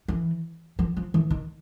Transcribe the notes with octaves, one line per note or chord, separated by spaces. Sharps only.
E3
F3
F3
E3
D#3